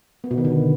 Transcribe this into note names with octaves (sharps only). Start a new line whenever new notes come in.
B3
B2
D#3
D3